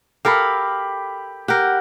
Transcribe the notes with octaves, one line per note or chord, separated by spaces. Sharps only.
G4 A4 A#4 F5 B5
G4 A#4 F#5